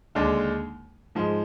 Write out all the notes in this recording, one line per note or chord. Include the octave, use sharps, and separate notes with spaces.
D#2 D3 G#3 D4
G#2 F3 G#3